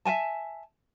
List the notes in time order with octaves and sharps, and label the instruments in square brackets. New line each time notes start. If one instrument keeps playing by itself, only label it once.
[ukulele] E5 F#5 G#5 A5